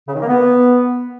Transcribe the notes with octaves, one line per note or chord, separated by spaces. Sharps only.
C#3
D#3
A#3
B3